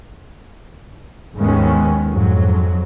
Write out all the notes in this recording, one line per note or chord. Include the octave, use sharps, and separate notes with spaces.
D#2 G#2 D#3 G#3 B3 C#4
F2 G#2 F#3